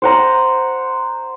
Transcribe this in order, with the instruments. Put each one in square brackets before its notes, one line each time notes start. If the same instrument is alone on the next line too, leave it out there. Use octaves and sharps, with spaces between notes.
[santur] C5 F#5 A#5